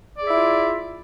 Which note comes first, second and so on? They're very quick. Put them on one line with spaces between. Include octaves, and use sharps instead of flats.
D5 G#4 E5 E4 F4